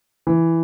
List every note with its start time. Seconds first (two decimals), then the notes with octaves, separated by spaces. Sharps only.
0.27 E3